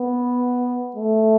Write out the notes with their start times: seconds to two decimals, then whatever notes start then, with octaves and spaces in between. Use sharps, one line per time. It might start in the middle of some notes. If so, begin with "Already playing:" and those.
Already playing: B3
0.96 A3